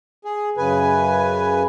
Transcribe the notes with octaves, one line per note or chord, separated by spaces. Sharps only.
G#4
F#2 C#3 B4 G#5